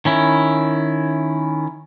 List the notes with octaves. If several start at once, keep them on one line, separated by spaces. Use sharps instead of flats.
D#3 C#4 E4